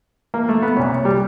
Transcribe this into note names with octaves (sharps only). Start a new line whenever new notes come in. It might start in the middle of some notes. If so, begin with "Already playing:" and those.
A#3
A3
B3
C2 A#2 C#4
G3